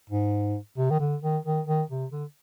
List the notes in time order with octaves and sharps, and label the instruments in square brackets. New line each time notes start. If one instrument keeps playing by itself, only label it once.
[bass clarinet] G#2
C3
D#3
D3
D#3
D#3
D#3
C3
D3